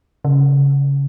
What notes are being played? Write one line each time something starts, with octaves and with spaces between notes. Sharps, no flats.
C#3